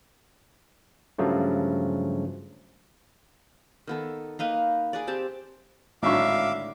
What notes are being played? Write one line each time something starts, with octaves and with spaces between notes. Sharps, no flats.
G2 C#3 F3 F#3 A3
D#3 B3 A4
A#3 D#4 B4 F5
G#4 B4 D5
C4 G4 A5
G#1 A2 D3 F#3 E5 F5 C#6 D6